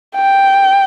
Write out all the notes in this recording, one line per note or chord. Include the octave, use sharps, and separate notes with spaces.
G5